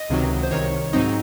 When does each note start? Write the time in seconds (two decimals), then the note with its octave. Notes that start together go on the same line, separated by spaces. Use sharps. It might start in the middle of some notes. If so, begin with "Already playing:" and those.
Already playing: D#5
0.09 C#2 C3 D#3 F#3
0.43 C5
0.51 C2 C3 D#3 C#5
0.93 G#2 F#3 C4 D#4